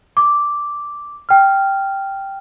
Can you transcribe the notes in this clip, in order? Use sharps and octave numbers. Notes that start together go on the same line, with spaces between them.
D6
G5 F6